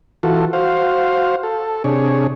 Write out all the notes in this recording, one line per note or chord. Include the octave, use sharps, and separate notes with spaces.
E3 F4 F#4 A4
F#4 C5 F5
A4
C3 D4 G#4 C#5